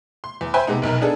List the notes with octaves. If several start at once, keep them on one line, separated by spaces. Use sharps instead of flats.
C6
E2
C5 E5 G5 G#5 B5 C6
C3 G#3 B3 D#4
F1 B1 D#4 A#4
B3 D4 D#4 G#4 A4